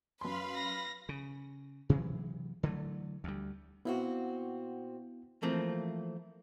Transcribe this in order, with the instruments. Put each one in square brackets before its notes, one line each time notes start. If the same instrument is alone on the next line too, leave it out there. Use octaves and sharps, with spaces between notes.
[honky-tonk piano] F#2 C6 [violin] B4 [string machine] F5 B5
[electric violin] A#6
[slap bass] C#3
C3 E3 F#3 G#3
D3 E3 F#3 A3
D2 G3
[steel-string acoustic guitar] A#2 C4 F#4 [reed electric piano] B3 E4 F5
[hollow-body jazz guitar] E3 F3 A3 A#3 C4